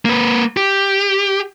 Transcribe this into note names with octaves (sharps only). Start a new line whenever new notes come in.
A#3 B4
G4